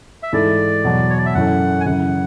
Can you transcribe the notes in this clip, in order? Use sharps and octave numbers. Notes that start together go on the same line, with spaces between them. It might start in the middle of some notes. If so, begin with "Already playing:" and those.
E5
G#2 E3 A3 E4 A4 D5
E2 B2 F#3
C#5
D5
E5
F#2 E3 A3 C#4 F#5
G#5
F#2 C#3 E3 F#5